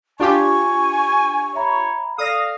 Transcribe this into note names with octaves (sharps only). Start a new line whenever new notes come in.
D4 F4 G4 G#5 C#6
C#5 E5 A#5 B5
A4 D5 F5 D#6 A#6